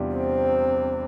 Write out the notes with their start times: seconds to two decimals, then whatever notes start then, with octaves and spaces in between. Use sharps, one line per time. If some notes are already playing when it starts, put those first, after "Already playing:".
Already playing: E2 C3 G3 D4 F4
0.15 C4